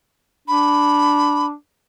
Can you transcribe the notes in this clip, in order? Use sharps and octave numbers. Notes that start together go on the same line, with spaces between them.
D4 B5